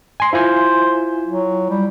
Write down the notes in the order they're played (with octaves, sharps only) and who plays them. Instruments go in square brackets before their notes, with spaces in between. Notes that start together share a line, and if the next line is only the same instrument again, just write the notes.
[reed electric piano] G#5 C6
[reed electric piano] E4 F4 G#5 [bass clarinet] C5
[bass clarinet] F#3
G3